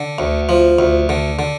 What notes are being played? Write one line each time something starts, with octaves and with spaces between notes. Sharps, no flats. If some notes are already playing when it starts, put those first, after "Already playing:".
Already playing: D3
D2
F3
D2
D3
D3